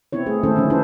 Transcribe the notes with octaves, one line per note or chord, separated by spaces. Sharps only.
B3 C4 E4 C#5
G#3 A3 G#4
D#3 A3 C#4 E4 A4 C5
D3 D#3 F3 F#3 G#3 C#4
D4 E4 A4 B4 C5